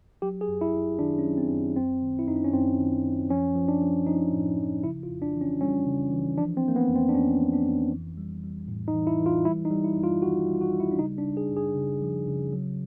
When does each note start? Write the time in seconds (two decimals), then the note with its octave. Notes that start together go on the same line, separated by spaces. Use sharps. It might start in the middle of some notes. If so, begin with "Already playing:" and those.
0.22 F#3 G4
0.41 G#4
0.48 F#2
0.61 E4
0.74 F#2
0.99 D#3 D4
1.19 C#4
1.25 F#3
1.38 C4
1.51 F#2
1.76 F#2 C4
2.02 D#3
2.19 E4
2.27 F#2 D#4
2.36 D4
2.45 C#4
2.53 F#2 C4
2.79 D#3
3.04 F#2
3.29 F3 C#4
3.55 F3
3.68 D4
3.82 F3
4.06 F3 D#4
4.32 A2
4.58 F3
4.84 C#3 E4
5.03 F4
5.10 F2
5.22 D4
5.35 E3
5.41 C#4
5.61 G3 C#4
5.87 C#3
6.12 E3
6.38 F3 D4
6.57 C4
6.63 F3 A#3
6.76 B3
6.89 F2
6.95 C4
7.09 D4
7.14 F2 C#4
7.40 F3
7.53 D4
7.66 F2
7.91 E3
8.17 G3
8.43 G3
8.68 A2
8.88 D#4
8.94 E3
9.07 E4
9.19 E3
9.26 F4
9.45 G3 E4
9.65 D#4
9.71 G3
9.84 E4
9.97 F#2
10.03 F4
10.22 D#3 F#4
10.48 G3
10.55 F4
10.61 F#4
10.73 G3
10.80 E4
10.92 D4
10.99 C#3 D#4
11.18 D4
11.25 C#3
11.37 G#4
11.51 F#2
11.56 G#4
11.76 C#3
12.02 F3
12.28 C#3
12.53 F#3